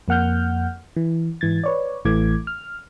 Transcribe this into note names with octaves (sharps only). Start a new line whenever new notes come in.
F2 A#3 F#5 F6 G6
E3
G#2 E3 G#6 A6
B4 C#5 D5
A1 E3 A3 D6 G#6
F6